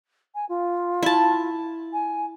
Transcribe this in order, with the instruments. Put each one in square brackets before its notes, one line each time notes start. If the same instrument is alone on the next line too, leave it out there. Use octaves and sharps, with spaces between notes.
[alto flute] G#5
F4
[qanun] E4 A5
[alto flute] G#5